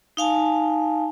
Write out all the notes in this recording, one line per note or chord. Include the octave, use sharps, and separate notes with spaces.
D#4 F5 G#5 A5